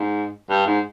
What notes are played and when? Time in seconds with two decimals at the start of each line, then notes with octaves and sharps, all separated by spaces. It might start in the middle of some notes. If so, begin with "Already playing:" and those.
Already playing: G#2
0.50 G2
0.67 G#2